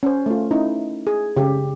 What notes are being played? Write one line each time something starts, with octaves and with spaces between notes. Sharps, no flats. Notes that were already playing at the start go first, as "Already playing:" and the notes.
C#4 C5
A3 F4
C#4 D#4 E4
G#4
C#3 G4